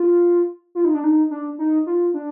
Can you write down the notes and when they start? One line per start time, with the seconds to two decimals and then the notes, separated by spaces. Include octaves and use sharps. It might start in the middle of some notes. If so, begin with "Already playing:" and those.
Already playing: F4
0.75 F4
0.85 D#4
0.94 D4
1.04 D#4
1.31 D4
1.59 D#4
1.87 F4
2.14 D4